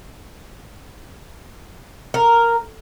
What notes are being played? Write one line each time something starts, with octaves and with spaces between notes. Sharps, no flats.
A#4